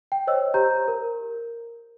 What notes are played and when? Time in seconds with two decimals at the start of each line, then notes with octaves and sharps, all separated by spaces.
0.12 G5
0.27 C5 C#5 D#5 E6
0.54 G4 C5 A#5 G6
0.88 A#4